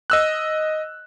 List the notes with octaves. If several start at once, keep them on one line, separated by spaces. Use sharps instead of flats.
D#5 E6 F#6